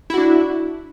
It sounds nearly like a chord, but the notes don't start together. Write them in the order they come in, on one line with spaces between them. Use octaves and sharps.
E4 F#4 D4